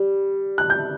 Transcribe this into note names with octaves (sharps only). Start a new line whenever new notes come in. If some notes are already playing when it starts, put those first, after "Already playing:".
Already playing: G3
F#6
G6